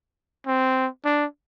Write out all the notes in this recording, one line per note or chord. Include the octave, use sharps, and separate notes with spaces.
C4
D4